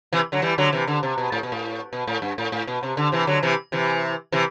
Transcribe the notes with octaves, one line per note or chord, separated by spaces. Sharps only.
C3 E3
D3 F#3
E3 G3
D3 F#3
C3 E3
D3
C3
B2
A2
B2
A2
B2
A2
G2
A2
A2
B2
C3
D3
C3 E3
D3 F#3
C3 E3
C3 E3
C3 E3